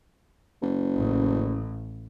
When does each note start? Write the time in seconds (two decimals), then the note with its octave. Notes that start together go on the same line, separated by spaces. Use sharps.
0.62 F#1
0.96 A1